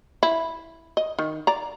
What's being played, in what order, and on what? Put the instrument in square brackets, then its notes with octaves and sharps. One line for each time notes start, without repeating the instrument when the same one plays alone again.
[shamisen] E4
D#5
D#3
D5 A#5